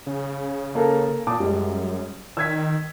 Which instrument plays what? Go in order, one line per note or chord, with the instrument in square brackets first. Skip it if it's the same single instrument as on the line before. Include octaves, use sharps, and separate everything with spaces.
[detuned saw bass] C#3
[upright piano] A#3 A4 A#4
[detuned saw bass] A#2 [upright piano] A5 D6 D#6
[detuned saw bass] F#2 [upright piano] G3 G#3
[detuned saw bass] D#3 [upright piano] E6 G#6 B6